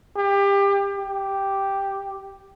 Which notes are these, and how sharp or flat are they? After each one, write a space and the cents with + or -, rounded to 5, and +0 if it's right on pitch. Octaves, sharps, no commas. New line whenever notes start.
G4 +25
G4 +0